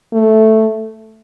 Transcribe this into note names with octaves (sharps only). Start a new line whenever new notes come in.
A3